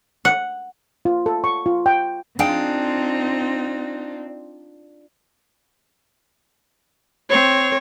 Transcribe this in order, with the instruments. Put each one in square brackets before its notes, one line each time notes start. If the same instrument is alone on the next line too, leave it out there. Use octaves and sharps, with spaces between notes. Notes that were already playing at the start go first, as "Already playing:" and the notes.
[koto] F#5
[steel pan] F4
A4
C#6
F4
G5
[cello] C4 [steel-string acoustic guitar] D4 [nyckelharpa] D#4 F4 [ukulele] G#4 F5 G5
[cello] C4 [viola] C#5